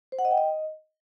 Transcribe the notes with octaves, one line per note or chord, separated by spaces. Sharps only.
C5
F#5
D#5
G5
D#5